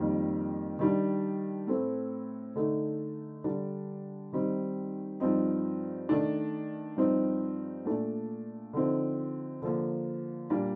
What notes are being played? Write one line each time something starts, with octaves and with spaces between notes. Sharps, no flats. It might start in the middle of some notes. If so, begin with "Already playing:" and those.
Already playing: F2 D#3 G3 A#3
D#3 G3 D4
A2 A3 C4
D3 A3 D#4
D3 G3 D4
D#3 G3 C4 D#4
G2 F3 C4 D#4
D#3 A3 D4
G2 F3 C4 D#4
A#2 A3 D4
D3 F3 C4 D#4
D3 F3 A#3
A#2 G3 A#3 D4